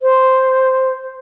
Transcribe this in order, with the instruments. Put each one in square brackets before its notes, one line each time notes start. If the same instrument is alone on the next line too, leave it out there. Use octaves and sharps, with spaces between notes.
[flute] C5